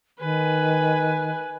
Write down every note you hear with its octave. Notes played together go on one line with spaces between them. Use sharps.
D#3 B4 G#5